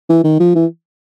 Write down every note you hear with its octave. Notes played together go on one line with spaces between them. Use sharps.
E3
D#3
F3
E3